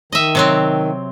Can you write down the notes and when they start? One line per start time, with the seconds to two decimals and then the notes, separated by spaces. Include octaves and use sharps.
0.12 D#3 D#5 E5
0.35 C3 F#3 C4